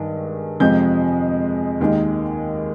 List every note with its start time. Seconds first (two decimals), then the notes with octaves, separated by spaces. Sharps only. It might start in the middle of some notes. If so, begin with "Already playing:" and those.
Already playing: G2 D#3 G#3
0.60 F2 C3 F3 G#3 G6
1.80 D#2 D#3 G#3